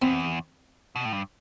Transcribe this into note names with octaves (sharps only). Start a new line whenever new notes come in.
E2 C4
B2
A2
G2